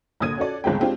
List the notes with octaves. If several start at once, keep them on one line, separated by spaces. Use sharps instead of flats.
A#1 A#2 D3 D#6 G#6 D#7
C#4 F#4 A4 D5
G1 C#2 G#3 C4 G5
G#3 C4 D4 F4 G4